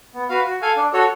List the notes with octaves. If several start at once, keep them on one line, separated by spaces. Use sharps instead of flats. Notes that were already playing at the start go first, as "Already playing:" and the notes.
B3
F#4 B4 F5
F#4
A4 F5 G#5
D4
F#4 A4 C#5